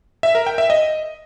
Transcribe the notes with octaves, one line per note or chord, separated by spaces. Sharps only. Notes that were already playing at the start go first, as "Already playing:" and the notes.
E5
A#4
G5
E5
D#5